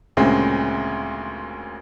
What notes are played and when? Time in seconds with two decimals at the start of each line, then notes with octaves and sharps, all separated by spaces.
0.17 D2 A#2 C#3 G#3 C4